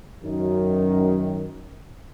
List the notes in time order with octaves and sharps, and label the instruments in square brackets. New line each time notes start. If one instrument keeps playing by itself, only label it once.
[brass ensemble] F#2 D#3